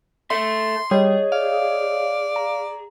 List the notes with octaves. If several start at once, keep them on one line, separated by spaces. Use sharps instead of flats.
A4 E5 C6
G3 G#4 C#5 D#5
D5 F5
A#5